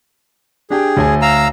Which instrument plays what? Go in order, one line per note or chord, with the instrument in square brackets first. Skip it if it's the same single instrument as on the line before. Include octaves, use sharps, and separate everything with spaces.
[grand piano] D4 G4 G5 [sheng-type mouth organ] G#4
[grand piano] D2 C#5 G#5
[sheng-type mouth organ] F5 A#5 E6